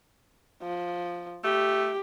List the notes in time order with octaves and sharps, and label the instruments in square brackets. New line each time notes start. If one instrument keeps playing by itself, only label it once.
[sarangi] F3
[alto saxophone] A3 [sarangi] G4